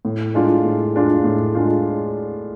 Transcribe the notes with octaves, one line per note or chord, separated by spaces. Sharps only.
A2
G#3 D4 F4
A2
G#3 D4 F4
A2
G#3 D4 F4